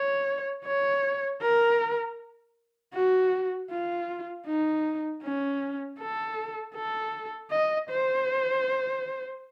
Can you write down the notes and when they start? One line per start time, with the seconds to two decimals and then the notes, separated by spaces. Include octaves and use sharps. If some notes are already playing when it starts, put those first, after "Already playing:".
Already playing: C#5
0.66 C#5
1.42 A#4
2.94 F#4
3.70 F4
4.46 D#4
5.23 C#4
5.99 A4
6.75 A4
7.51 D#5
7.90 C5